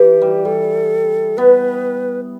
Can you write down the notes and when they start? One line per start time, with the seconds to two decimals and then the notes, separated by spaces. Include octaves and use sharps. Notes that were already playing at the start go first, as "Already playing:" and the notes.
Already playing: E3 G4
0.21 G3
0.45 G3 A4
1.37 B3 B4